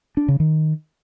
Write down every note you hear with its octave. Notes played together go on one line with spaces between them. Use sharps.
D4
C#3
D#3